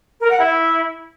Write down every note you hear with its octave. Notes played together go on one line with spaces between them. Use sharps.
A#4
F#5
E4